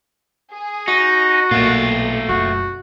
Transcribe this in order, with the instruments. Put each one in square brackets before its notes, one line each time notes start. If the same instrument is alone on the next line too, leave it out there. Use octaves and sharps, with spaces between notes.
[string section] G#4
[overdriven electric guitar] D#4 [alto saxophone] F#4
[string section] B1 [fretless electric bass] A#2 [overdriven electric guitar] A3 F4
[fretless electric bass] F#1 [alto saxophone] F#4